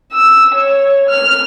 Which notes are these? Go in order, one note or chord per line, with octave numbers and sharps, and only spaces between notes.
E6
C#5
F6